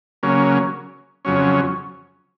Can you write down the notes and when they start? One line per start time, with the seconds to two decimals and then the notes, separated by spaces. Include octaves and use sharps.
0.23 C#3 F#3 A#3 C#4
1.25 F2 C#3 F#3 C#4